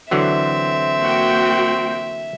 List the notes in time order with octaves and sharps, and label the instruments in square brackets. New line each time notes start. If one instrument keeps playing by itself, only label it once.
[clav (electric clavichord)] D3 E3 F#3 [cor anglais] C4 [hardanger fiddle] E5
[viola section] A#3 F#4 G5